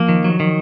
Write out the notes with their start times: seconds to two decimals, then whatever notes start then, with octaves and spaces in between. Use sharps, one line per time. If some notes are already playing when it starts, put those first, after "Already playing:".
Already playing: F3 A#3
0.09 D#3
0.24 F#3
0.40 D#3